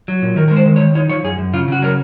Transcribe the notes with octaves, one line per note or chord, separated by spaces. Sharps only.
F#3
A#2
D#3 A#4
G#3 A#4
C5
D#3
C#5
D#3
D#4 C#5
F3 C#5
F#2 G#4
F#2
C#3 F4
C#3 F#4
F#3 A#4